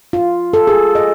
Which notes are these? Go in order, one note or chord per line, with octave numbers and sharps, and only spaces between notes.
F4
A4
G#4
D#5